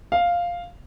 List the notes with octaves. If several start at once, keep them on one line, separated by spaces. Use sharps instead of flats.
F5